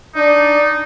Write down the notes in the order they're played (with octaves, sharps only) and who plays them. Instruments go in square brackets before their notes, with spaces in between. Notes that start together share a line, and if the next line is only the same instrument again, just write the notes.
[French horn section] D4 D5 [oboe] D#4